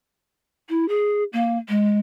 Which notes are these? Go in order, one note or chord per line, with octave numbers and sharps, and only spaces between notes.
E4
G#4
A#3
G#3